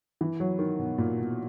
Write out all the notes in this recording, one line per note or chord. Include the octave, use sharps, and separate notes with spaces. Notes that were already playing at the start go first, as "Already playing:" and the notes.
E3
F#3
D#3
B2
A#2
B2